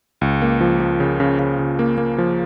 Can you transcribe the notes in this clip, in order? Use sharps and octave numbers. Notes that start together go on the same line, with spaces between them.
C#2
A#3
F3
F3
C#3
C#3
C#3
C#3
A#3
A#3
F3